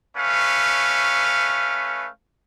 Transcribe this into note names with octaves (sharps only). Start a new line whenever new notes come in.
A3 C#4 B4 F5